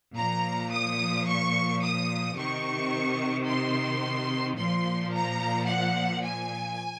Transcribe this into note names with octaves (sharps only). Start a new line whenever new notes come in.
A#2 F3 A#5
D#6
C#6
D#6
C3 D#3 C#6
C6
A#2 F3 C6
A#5
F#5
G#5